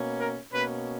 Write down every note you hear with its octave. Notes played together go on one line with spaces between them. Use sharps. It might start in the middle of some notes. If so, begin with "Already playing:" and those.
Already playing: B2 A#3 C#4
A#4
B2 A#3 C#4 B4